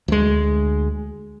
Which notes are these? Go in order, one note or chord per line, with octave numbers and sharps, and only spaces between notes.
D2 G#3